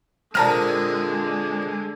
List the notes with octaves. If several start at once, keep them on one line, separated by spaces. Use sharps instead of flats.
A#2 D3 G#3 C4 A5 A#5 F6